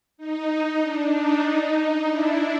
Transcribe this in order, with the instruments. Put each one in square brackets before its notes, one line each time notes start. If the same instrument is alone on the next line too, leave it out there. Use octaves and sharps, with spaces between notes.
[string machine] D#4
D4
D#4
D4 E4